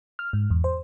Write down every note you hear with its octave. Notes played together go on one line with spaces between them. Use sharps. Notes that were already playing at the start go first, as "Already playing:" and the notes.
F6
G#2
E2
C5